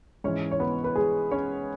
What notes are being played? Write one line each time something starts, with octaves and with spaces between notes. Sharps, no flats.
G#2 E3 C#4 C#5
C#5
B3 B4
B4
G#3 G#4
C#4 C#5